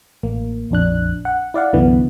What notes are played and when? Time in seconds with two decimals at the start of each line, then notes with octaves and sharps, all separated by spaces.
0.23 A1 A#3
0.70 A#1 F2 D4 F#6
1.25 F#5
1.54 E4 D5 F5 F#5
1.73 C2 F#2 D3 E3 B3